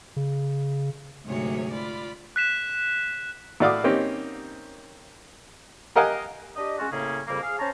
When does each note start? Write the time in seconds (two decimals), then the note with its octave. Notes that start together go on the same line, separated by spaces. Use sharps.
0.16 C#3
1.24 D2 G#2 C3 F#3 G#4 C#5
1.71 F4 D5 B5
2.36 F#6 B6 E7
3.60 A2 F#4 D5 F5 D6 D#6
3.84 A#3 C4 C#4 D#4 G4
5.96 G4 A#4 D#5 F5 F#5 G#5
6.56 D4 G4 D#5
6.79 G#3 C#4 F4 F#4
6.91 A2 C#3 A#3 C#4 G#4
7.27 F2 C#3 G3 A#3
7.41 G#4 F5
7.59 C#4 C5 C#5 A5 A#5